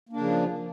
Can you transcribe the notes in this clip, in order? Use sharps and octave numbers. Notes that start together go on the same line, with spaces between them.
C#3 F3 A#3 D4